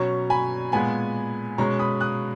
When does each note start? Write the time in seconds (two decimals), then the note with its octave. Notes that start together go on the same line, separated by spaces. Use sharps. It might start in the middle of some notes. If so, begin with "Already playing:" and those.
Already playing: B2 F#3 C#4 A#5 C#6
0.30 G#5 B5
0.72 A#2 G#3 B3 G#5 B5
1.58 B2 G#3 C#4 A#5 C#6
1.79 B5 D#6
2.00 D#6 F#6